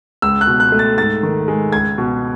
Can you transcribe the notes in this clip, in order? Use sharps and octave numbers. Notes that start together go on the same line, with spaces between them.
C#2 E6
F#6
B2
F#6
A3
A6
G#2 A6
D#3
G#3
C#2 G#6
B2